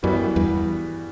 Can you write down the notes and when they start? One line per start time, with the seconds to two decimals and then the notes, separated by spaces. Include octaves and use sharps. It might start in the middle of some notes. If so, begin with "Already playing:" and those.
0.03 F#2 E3 G3 B3 F#4
0.36 E2 G2